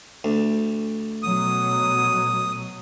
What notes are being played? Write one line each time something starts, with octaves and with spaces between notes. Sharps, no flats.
D2
B2 F#3 D#6